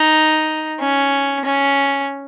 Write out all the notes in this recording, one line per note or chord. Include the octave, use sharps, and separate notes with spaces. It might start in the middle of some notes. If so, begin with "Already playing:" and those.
Already playing: D#4
C#4
C#4